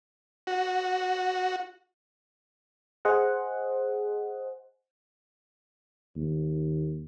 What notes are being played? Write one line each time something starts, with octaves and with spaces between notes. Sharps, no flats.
F#4
G#4 C5 D#5 F#5
D#2